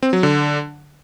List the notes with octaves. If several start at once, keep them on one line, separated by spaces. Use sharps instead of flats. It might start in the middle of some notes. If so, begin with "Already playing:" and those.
C4
F#3
D3